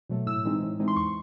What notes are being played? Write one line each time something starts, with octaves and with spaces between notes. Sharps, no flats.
B2 F#3 A3
A2 E6
E3 G#3 C4 D#4
A2
E3 G#3 C4 D#4
C6
E2 C#6